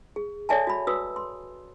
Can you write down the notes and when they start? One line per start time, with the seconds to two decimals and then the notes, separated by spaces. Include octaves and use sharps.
0.16 G#4
0.49 A4 C#5 D5 E5 G#5 A5
0.67 F#4 B5
0.87 F#4 B4 D#6 E6
1.16 C6